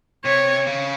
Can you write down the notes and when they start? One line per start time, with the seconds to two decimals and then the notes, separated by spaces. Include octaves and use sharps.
0.25 C3 C#5
0.67 C#3